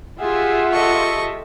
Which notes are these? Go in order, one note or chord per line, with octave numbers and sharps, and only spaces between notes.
F4 G4 G#4 E5 F#5
A4 D#5 C#6